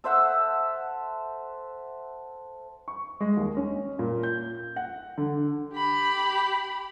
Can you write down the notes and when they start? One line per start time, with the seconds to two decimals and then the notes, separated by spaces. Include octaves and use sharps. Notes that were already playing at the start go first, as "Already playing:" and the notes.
0.04 A4 C5 E5 F#5
2.88 C#6
3.20 G#3
3.37 D#2
3.57 C#4
3.99 A#2
4.23 G6
4.76 F#5
5.18 D3
5.74 G4 B5